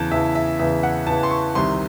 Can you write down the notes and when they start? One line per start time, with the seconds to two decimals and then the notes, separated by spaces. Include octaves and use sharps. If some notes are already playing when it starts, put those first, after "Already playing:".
Already playing: E2 C#3 E3 A5
0.11 E2 C#3 E3 E5
0.35 E5
0.59 E2 C#3 E3 E5
0.83 F#5
1.07 E2 C#3 E3 A5
1.23 C6
1.31 C#6
1.55 C2 C3 D#3 C6